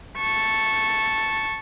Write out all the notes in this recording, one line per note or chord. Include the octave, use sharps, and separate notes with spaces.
A5 C#6